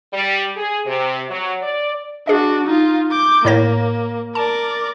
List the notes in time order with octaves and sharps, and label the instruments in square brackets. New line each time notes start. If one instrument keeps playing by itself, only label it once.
[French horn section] G3
G#4
C3
F#3
D5
[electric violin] D4 F#4 [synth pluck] G#4 D#5
[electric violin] D#4 F4
D6 G6
[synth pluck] A2 C#5 A#6 [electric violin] A#3
[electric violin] A#4 D5 [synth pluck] A5